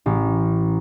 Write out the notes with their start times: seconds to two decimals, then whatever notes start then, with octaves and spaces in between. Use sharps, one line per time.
0.06 A1